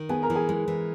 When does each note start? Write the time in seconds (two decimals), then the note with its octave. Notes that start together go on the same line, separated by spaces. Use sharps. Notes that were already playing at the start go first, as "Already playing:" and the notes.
Already playing: D#3
0.09 B3 G#4 G#5
0.23 A#4 A#5
0.30 E3
0.35 G#4 G#5
0.49 G#3
0.68 E3